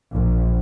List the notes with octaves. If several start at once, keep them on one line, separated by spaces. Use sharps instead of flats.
A#1